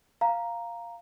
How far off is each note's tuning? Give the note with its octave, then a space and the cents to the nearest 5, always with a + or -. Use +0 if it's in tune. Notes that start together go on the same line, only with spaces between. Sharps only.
F5 +0 A#5 +0